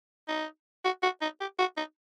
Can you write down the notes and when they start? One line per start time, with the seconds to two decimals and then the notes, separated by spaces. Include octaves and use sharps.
0.28 D#4
0.85 F#4
1.03 F#4
1.22 D#4
1.40 G4
1.59 F#4
1.77 D#4